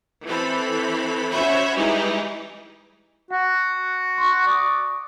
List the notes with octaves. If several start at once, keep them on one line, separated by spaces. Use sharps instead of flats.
E3 C4 A4 B5
C#4 F#4 C5 C#5 E5 B5
E3 G3 G#3 D#4 E4 G4
F#4 F#5
C6 C#6
D5 C#6 D#6